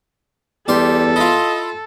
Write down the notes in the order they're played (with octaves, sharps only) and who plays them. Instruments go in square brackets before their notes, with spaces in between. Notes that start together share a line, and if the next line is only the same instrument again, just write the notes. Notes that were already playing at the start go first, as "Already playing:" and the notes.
[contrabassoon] E2 [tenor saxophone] G3 [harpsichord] G4 C6 [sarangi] A4
[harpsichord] E4 F4 [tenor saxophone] D#5